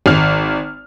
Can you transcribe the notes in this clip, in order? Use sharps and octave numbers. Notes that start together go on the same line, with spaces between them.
G#1 F6